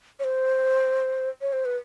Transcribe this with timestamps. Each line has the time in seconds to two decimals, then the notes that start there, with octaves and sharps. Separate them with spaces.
0.19 C#5
0.24 C5
1.41 C#5
1.53 C5
1.65 B4